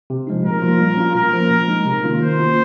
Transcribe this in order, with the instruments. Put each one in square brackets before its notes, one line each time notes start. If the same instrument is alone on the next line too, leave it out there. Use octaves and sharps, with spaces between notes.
[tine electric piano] C3
F3 G#3 D#4
[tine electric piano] A#2 [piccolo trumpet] A#4
[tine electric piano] F3 A#3 F4
G3
C#4 F4
[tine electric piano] A#2 [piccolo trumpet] A#4
[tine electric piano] F3 A#3
A#2
G#3 D#4
C3
D#3 A#3 C#4 F4
[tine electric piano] D#3 [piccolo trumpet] C5
[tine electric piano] A#3 F4